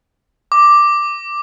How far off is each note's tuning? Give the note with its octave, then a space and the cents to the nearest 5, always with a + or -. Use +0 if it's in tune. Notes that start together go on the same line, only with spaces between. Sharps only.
D6 +5